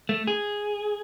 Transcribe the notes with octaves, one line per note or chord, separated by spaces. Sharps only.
A3
G#4